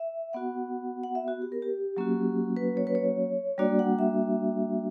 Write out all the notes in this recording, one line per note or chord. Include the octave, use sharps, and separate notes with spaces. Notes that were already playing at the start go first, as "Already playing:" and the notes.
Already playing: E5
B3 F#4 F#5
F#5
E5
F#4
G4
A#4
G4
F#3 A#3 C#4 F#4
B4
C#5
B4
C#5
G3 A#3 D4 F#4 D5
F#5
E5